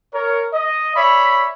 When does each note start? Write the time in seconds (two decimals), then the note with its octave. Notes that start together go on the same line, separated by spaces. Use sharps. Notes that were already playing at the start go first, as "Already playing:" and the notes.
0.14 A#4 C#5
0.53 D#5
0.96 C#5 D5 E5 B5